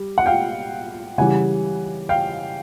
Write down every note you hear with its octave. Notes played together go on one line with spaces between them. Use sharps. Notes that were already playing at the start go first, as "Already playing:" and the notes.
Already playing: G3
F#5
F5 G5
C#3 E3 G3 F#5 G#5
F5 G5